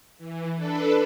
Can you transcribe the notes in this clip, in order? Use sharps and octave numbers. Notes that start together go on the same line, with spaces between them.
E3
D4 A4 B4